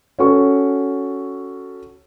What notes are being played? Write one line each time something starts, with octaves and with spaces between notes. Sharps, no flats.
C#4 F#4 A4 C#6